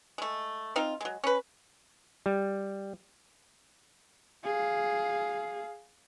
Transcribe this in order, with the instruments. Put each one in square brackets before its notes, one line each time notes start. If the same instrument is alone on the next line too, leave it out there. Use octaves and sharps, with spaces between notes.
[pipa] G#3 A3
C4 D#4 F4
F#3 G#3
C#4 B4
[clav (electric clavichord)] G3
[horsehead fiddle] G#4 F5